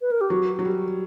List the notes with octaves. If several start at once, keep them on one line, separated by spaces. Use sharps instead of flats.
B4
A#4
G4
F#3 F#4
F#3
G3